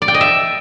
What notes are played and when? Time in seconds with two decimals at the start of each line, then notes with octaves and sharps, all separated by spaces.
0.02 D5
0.08 G5
0.14 D#5
0.21 E5